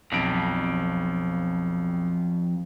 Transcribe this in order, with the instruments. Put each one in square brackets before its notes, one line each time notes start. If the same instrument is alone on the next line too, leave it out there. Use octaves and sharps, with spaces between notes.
[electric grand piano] B1 D7 [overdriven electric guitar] F2